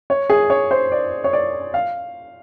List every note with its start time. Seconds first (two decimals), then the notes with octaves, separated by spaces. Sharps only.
0.10 C#5
0.30 G#4
0.50 C#5
0.71 C5
0.92 D5
1.24 C#5
1.33 D5
1.74 F5